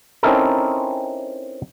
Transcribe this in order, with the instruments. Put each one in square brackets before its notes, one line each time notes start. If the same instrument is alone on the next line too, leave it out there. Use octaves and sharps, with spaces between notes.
[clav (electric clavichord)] C4 C#4 D#4 E4 A4 A#4